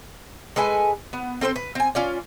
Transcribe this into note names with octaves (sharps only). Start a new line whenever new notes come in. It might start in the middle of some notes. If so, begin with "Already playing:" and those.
G#3 A4 B4 G#5
B3
C4 A4 B4 C5
B4
C4 G#5
C#4 F4 D5